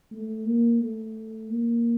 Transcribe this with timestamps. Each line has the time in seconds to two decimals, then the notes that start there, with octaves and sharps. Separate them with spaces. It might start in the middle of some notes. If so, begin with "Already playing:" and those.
0.11 A3
0.46 A#3
0.81 A3
1.50 A#3